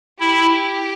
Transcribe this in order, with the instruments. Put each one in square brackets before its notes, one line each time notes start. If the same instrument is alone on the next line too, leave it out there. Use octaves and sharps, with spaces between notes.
[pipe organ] E4 [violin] G4